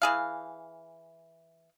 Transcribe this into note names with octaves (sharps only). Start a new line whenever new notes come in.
E3 G#4 F5